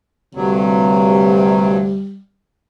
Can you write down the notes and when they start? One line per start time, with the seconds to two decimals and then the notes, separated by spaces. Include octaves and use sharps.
0.35 D2 G2 C3 F#3 G3